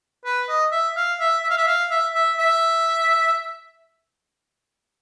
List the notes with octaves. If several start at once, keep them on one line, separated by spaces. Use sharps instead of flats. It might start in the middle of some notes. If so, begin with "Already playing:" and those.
B4
D#5
E5
F5
E5
E5
F5
E5
F5
E5
E5
E5